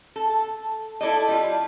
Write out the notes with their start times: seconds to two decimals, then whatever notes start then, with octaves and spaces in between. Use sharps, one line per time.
0.16 A4
1.01 E4 A4 D5 D#5
1.28 G3 F4